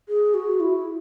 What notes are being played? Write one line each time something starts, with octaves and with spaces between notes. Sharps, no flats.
G#4
F#4
E4